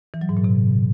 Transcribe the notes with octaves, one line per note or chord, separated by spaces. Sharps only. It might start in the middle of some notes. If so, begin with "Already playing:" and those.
E3
F#3
G#2
A#2
C3